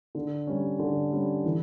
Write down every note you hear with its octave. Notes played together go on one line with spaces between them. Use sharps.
D3
G3 C#4
D3
G3 C#4
E3